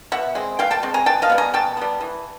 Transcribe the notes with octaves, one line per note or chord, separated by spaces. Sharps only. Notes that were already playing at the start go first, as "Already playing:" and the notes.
B2 E5 F#5
G#3 C4
B2 F5 G5
G5 A5
G#3 C4
G#5 A#5
B2 G5 A5
D#5 F5
G3 B3
G#5 A#5
B2 G5 A5
G3 B3
E3